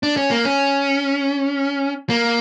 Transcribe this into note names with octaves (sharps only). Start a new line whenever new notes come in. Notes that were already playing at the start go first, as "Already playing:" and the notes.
D4
C#4
A#3
C#4
A#3